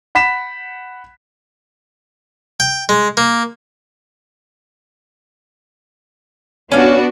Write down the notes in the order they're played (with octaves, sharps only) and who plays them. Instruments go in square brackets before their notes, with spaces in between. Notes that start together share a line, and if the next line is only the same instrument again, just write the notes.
[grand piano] F#5 B5 B6 E7
[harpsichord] G5
G#3
A#3
[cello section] B3 D4 F#4 [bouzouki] C#4 F5